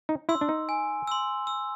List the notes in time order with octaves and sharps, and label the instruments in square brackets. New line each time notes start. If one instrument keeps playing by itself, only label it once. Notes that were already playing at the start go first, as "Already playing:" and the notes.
[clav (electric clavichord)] D#4
[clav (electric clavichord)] E4 [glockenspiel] C6 E6
[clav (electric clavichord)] D4
D#4
[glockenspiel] G#5
C6 E6
E6